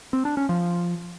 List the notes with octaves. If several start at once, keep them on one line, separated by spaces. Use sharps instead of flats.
C4
D4
C#4
F3